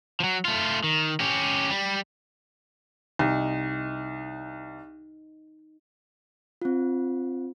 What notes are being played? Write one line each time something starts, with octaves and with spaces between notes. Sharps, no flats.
F3 F#3
A3 F4
D#3
C#4 G4
G3
C2 D#4
C4 F4